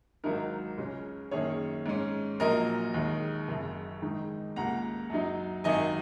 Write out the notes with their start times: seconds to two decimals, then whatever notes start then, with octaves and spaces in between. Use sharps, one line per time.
0.24 G#1 G#2 F#3 D#4 A#4
0.77 C#2 C#3 G#3 C#4
1.31 F#2 D#3 A#3 C#4 G#4 C#5
1.86 G#2 G#3 C#4
2.40 A#1 A#2 F#3 A#3 A#4 D#5
2.94 D#2 D#3 G#3
3.48 F#1 F#2 C#3
4.02 G#2 D#3 G#3 D#4
4.56 C#2 C#3 A#3 F#5 A#5
5.10 F#2 F#3 D#4
5.64 G#1 F#2 D#3 F#3 D#5 G#5